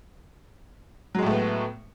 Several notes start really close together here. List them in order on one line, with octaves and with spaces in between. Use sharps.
F#3 G#3 A2 A3 B3